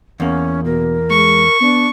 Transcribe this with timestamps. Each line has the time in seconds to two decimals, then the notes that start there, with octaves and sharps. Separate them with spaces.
0.20 E2 A#3 C#4
0.65 B2 A#4
1.10 G#3 C#6
1.61 B3 D4